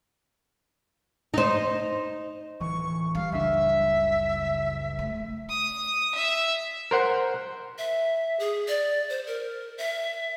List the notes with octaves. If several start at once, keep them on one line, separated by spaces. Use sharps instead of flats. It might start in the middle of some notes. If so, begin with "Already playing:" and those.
D#4 C5
D1 E3 C#6
G3 F5
F#1 C#2 D4 E5
A3
D#6
E5
A#4 C5 F#5
E5
G#4
D5
C5
A#4
E5